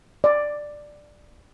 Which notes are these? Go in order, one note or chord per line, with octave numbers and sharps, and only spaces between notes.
D5